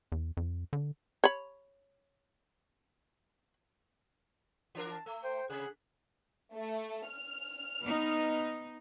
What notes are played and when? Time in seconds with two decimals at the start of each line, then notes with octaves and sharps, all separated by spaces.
0.12 E2
0.37 F2
0.73 D3
1.24 C#5 B5
4.75 E3 D4 A#4
4.90 A5
5.06 A3 E6
5.24 C5 G5
5.50 C3 G#4 F#6
6.54 A3
7.09 F6
7.80 B3 D#4